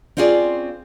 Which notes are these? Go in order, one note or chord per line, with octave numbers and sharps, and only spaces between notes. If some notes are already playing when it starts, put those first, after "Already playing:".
C4 C#4 F4 G#4 D5